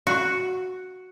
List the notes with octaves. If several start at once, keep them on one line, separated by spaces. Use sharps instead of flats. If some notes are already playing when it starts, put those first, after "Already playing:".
F#4